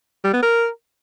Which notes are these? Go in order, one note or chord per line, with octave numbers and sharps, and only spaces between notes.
G3
B3
A#4